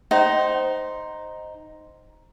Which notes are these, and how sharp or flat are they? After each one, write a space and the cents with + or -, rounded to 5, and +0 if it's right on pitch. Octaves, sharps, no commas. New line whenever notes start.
D#4 +0 C5 +0 G5 -40